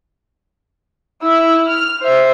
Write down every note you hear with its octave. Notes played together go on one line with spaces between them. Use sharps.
E4 E6
F6
C5 E5